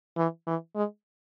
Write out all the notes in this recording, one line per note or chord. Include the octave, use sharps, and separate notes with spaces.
E3
E3
G#3